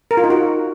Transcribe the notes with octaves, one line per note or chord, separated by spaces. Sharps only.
A#4
F4
D#4
F#4